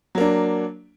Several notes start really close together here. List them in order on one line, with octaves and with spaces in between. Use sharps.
F#3 A#3 D4